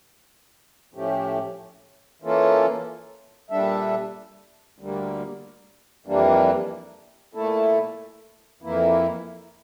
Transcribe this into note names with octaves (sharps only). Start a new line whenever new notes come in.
A2 F3 A3 C#4 G4
E3 A#3 C#4 F4 A4
A#2 G3 D4 A4 E5
D2 D3 G3 A#3
F2 E3 G3 A#3 D4
A#2 A3 E4 A4
F2 E3 A#3 E4